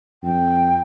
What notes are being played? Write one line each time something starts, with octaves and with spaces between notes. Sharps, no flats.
F2 G5